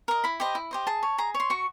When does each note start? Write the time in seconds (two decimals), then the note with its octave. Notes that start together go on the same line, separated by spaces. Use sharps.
0.08 A#4 D#5
0.24 E4 B5
0.40 G4 C5 D#5
0.55 E4
0.71 G4 C5 D#5
0.87 G#4 A5
1.03 C#5
1.18 G#4 A#5
1.34 C#5
1.40 C6
1.50 F#4 C#6